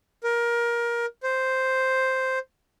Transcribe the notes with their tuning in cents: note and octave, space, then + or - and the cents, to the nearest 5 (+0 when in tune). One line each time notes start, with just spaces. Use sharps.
A#4 +20
C5 +0